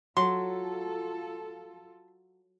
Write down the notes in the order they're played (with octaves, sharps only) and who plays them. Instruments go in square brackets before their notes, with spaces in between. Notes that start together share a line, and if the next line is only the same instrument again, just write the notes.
[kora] F#3 [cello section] F4 A4 [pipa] C6